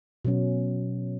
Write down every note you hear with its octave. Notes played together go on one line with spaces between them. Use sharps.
B2 F#3 C#4